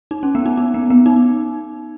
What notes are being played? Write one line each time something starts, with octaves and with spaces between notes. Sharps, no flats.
D#4
C#4
B3
D#4
D#4
B3
B3
D#4